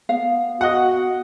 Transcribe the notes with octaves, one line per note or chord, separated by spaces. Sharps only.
B3 F5
F#4 D#5 F#5